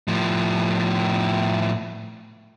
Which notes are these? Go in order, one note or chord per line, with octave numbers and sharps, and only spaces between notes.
A2 F3